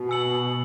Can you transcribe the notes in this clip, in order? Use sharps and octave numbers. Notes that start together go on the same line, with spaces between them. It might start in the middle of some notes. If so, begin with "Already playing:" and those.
Already playing: B2
G#5 E6 C#7 F#7